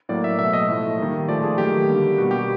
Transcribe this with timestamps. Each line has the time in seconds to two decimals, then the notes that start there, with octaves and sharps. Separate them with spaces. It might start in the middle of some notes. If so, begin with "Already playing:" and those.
0.09 A2 F#3 A#3 D5
0.24 E5
0.38 B2 F#3 A3 E5
0.53 D#5
0.68 A2 F3 A3
0.98 D#3 G3 A#3
1.29 A#2 F3 A3 D5
1.44 G#4
1.58 D#3 F#3 A3 G4
1.88 D3 G3 A#3
2.18 B2 G3 A#3 F#4
2.31 G4